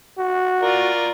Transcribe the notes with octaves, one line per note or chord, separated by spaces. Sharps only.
F#4
F4 A#4 D5